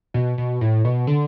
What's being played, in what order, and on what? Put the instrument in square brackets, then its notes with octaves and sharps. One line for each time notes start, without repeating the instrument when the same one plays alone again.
[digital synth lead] B2
B2
A2
B2
D3